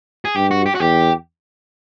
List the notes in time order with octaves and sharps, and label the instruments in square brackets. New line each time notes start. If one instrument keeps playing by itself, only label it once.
[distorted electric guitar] G#4
[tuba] G2 [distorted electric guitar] G4
[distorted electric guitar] F#4
G4
F#4
[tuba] E2 [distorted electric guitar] G4